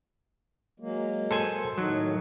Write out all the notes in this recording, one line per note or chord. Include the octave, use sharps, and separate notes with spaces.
F#3 G#3 A#3
A4 C5 G#5
A2 D#3 F#3 D#4